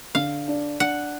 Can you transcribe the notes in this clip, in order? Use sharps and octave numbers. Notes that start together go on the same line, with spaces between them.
D3 F5
D4
D4 F#5